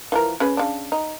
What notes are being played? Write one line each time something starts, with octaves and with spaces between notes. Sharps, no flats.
E3 F3 A#4
C#4 G#4 B4
C#3 D4
D#4